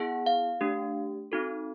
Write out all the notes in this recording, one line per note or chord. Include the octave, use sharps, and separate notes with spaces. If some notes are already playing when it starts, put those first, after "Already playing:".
Already playing: B3 E4 G#4 F#5
F5
A3 D4 G4
C4 D#4 F#4 A4